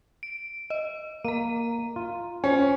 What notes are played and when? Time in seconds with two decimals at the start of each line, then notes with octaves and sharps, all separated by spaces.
0.23 D7
0.70 D#5
1.25 A#3 A#5 D#7
1.96 F4
2.44 C#4 C5